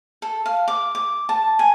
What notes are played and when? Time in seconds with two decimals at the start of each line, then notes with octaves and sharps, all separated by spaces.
0.22 A4
0.46 F5
0.68 D6
0.95 D6
1.29 A5
1.59 G#5